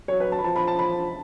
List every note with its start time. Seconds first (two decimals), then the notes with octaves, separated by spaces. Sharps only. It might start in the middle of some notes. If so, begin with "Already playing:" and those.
0.08 F#3 C#5
0.20 B4
0.32 A5
0.38 B5
0.43 F3 A5
0.56 B5
0.68 A5
0.79 B5